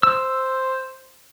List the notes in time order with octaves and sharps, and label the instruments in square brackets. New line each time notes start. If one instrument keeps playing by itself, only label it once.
[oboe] C5 [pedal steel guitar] E6